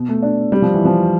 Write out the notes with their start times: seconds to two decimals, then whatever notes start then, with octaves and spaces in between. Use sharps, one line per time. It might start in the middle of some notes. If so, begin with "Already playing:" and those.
Already playing: B2
0.09 A3
0.23 D4
0.52 G3
0.62 F3
0.74 E3
0.85 F3